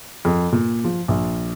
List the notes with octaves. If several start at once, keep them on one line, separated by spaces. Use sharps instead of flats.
F2
A#2
F3
A#1